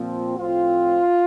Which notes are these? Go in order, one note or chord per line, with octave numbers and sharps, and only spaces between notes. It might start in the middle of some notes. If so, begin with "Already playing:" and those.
Already playing: A#2 F3 C4
A2 F3 C4 F4